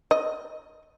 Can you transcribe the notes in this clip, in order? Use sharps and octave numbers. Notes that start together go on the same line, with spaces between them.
D#5